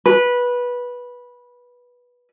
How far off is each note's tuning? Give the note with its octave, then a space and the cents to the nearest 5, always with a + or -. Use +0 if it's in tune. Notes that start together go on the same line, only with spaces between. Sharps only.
B4 -15